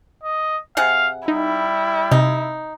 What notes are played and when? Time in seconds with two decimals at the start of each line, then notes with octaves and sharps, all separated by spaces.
0.24 D#5
0.77 C3 G#4 F5 F#5
1.28 G3 D#4 E4
2.11 C3 D#4